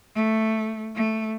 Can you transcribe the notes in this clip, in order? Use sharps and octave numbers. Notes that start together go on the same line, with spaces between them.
A3
A3